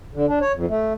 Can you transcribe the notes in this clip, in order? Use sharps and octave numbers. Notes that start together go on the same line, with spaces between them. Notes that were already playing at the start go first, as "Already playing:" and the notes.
D3
D4
C#5
F2
A3